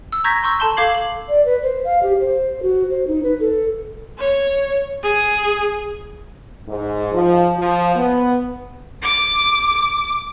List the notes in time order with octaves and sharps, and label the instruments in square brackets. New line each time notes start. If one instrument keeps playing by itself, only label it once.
[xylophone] E6
A#5 C#6 G6 G#6 A#6 B6
C6 C#6 E6
A4 A5 C6 G6
A4 F5 D6 G#6 C7 F#7
F#7
[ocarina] D5
B4
C5
F5
G4
C5
F#4
C5
D#4
B4
A4
[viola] C#5
G#4
[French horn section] G#2
F3
F3
B3
[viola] D6